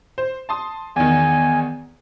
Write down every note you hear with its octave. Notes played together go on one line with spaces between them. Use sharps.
C5
A5 C6 D#6
E2 D#3 G#5